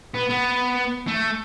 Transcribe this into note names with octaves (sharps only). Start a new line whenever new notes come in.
B3
B3
A3